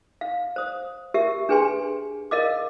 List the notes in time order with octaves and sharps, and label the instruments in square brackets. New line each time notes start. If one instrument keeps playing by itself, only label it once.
[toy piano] F5
C5 D#6
G4 A#4 E5
D4 G#4 B4 G5 G#5 C6
A#4 D#5 F5 D6